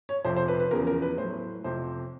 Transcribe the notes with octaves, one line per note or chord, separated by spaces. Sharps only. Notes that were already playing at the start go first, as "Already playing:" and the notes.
C#5
F2 C3 F3 C5
C5
B4
B4
E2 C#3 F3 A#4
A#4
B4
A2 F#3 C5
F2 C3 F3 C5